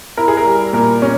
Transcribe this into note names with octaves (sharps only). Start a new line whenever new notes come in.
E4 A#4
G#4
A#4
G3
A#2 A#4
C#4